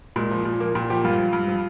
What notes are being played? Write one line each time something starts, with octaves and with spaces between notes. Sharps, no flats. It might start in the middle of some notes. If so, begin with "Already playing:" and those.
A#2 G#3
F3
A#2
F3 A#3
A#2 G4
F3 G4
G2 F4
F3
G2
F3